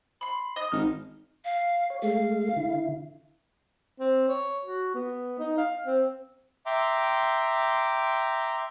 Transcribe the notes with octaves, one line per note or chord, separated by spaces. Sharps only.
B5 C6
D#5 D#6
G#1 F6
F5
C#5
G#3 A3 F5
D3 E4
C4
C#5
F#4
B3
D#4
F5
C4
E5 G5 A#5 C6 D6